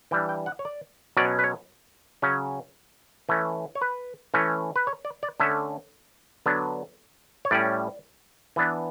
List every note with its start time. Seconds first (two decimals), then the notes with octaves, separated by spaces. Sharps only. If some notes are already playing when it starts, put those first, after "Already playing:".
0.11 E3 G3 D4 G5
0.29 G5
0.46 F#5
0.59 C#5
0.65 D5
1.17 B2 F#3 C#4 D5
1.39 B4
1.44 C#5
2.22 C#3 F#3 C#4
3.29 E3 A3 C#4
3.75 C#5
3.81 B4
4.34 E3 A3 C#4
4.76 B4
4.87 C#5
5.05 D5
5.23 D5
5.40 D3 A3 C#4 E5
6.46 D3 F#3 B3 D4
7.45 C#5
7.51 A2 G3 C#4 D5
8.56 E3 B3 D4